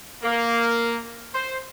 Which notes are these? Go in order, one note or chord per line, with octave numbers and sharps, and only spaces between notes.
A#3
C5